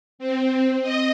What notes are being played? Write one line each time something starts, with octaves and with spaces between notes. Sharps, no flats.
C4
D#5